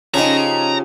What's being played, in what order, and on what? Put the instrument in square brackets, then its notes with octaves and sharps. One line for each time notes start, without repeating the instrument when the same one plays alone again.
[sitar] C#3 C#4 [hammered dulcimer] F3 G4 [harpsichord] D#4 G#4 [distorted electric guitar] A#5